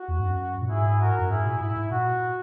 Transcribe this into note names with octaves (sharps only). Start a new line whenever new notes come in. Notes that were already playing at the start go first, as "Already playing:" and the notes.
Already playing: F#4
E2
G#2
F#2
A#2
G#2 E4 G#4
F#4 A#4
F#2
G#2 E4 G#4
A#2
G#2 E4
G#2
A#2 F#4